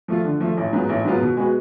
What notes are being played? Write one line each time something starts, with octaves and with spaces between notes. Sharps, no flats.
F3 A3 F4
D3
F3 A3 F4
A1
G#2 F#3 B3 F4
A1
G#2 F#3 B3 F4
B2
G#3 B3 F#4